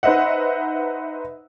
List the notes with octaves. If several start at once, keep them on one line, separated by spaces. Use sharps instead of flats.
D#4 B4 C5 D#5 E5 F#5